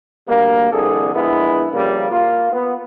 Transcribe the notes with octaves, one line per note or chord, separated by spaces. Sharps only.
D2 G3 A#3
C2 F2 D3 G#4 A4
A#1 G#3 B3 E4
C#3 F3 G3 A#3
A#3 F4
B3